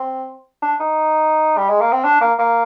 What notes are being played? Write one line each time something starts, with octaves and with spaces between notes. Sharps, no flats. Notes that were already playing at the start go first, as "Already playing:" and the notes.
Already playing: C4
D4
D#4
G3
G#3
A#3
C4
D4
A#3
A#3